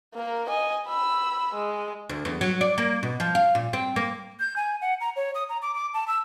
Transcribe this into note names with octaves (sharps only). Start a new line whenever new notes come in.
A#3 A#4
D#5 G#5
B5 E6
G#3
D2
E2
F#3
D5
A#3
B2
F3
F5
A#2
C4
A#3
G6
G#5
F#5
A#5
C#5
D#6
A#5
D6
D6
A5
E6